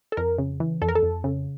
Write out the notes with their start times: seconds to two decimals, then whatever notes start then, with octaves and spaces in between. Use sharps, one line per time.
0.12 A4
0.17 F2 A#4
0.38 C#3
0.60 E3
0.82 F2 A4
0.88 A#4
0.95 A4
1.03 F2
1.24 C#3